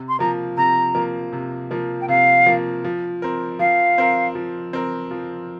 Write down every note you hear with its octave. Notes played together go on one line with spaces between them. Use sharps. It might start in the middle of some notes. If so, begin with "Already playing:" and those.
Already playing: C3
C6
F3 A#3 A#5
C3 A#5
F3 A#3
C3
F3 A#3
G5
C3 F5
F3 A#3
F3
C4 A#4
F3 F5
C4 A#4
F3
C4 A#4
F3